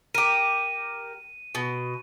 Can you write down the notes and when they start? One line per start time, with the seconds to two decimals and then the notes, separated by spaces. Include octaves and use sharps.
0.15 G4 A#4 D#7
1.55 B2